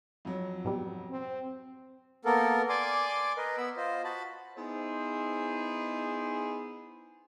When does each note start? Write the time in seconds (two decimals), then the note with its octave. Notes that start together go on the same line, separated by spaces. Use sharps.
0.25 F2 F#3
0.64 G#2 B2 G3
1.11 C4
2.25 A#3 B3 A4 A#4
2.69 D5 G#5 C6 D6
3.37 A#4 B4 D#5
3.57 B3 B5 E6
3.77 F4 C5 D#5
4.04 F#4 A5 B5
4.56 B3 D#4 E4 G#4 C5